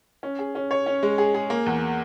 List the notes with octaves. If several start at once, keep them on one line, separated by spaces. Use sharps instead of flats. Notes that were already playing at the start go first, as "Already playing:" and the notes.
C#4
G#4
C#4
C#5
C#4
G#3
G#4
G#4
A#3
E2